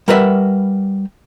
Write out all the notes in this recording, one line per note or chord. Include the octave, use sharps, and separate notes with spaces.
G3 A#4 B4 D#5 E5 F#5